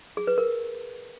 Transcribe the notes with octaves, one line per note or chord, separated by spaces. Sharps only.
G#4
B4
A#4